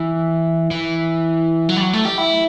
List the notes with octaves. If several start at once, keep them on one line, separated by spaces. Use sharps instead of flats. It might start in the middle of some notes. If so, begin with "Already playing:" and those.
Already playing: E3
E3
F#3
G3
F#3
A3
G4
E4